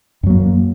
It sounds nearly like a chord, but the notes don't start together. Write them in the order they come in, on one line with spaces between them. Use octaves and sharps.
F#2 F#3 A#3